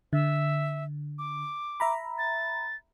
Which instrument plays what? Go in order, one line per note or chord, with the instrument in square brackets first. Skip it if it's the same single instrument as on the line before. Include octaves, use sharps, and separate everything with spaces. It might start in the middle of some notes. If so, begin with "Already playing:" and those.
[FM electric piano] D3 [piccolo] E5
[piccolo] D6
[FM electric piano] E5 A#5 B5
[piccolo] A6